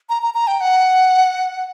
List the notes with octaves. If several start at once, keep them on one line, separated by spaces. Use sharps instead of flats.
A#5
A#5
A#5
G5
F#5